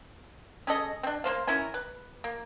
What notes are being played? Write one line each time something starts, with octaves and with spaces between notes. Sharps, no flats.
C#4 G#4 A4 D#5
C4 D4
A#3 D4 C5 F5
C#4 E4 A#4 G#5
B4
A#3